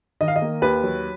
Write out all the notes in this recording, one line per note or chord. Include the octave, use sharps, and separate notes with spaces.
D#3 D#5
F5
D#5
A#3
D#2 B4
F#3